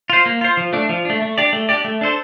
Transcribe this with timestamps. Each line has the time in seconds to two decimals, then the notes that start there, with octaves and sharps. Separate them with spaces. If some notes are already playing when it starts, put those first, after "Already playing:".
0.10 F4 C5
0.26 A#3
0.41 F4 C5
0.57 F3
0.73 A3 D4
0.89 F3
1.05 A3 D4
1.22 A3
1.38 D4 G4 D5
1.53 A3
1.69 D4 G4 D5
1.85 A3
2.01 D4 A4 C5